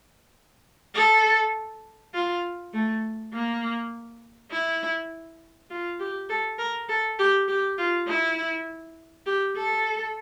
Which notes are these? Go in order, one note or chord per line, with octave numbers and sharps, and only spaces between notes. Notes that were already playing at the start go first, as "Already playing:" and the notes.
A4
F4
A3
A#3
E4
F4
G4
A4
A#4
A4
G4
G4
F4
E4
G4
A4